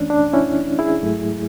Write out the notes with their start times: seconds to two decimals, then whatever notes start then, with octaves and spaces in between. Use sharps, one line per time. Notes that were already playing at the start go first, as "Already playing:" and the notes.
Already playing: F#2 E3 A3 C#4 D4
0.10 D4
0.33 C#4 E4
0.79 E4 G#4
1.02 G#2 F#3 A3